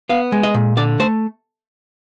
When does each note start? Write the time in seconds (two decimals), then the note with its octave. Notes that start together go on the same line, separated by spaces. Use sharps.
0.09 B3 F5
0.32 G#3
0.43 D#5
0.54 A#2
0.77 D3 D5
0.99 A3 C5